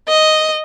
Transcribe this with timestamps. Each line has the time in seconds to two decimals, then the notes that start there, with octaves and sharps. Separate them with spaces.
0.08 D#5